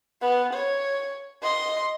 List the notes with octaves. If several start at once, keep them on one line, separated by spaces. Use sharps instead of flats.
B3
C#5
D#5 C6